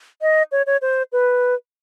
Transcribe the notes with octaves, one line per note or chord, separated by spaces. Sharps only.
D#5
C#5
C#5
C5
B4